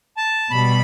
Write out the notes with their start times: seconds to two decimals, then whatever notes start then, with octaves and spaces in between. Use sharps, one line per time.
0.17 A5
0.50 B2 G3 B5